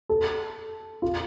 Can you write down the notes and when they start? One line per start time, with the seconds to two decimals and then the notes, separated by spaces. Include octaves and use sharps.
0.09 A4
1.02 F4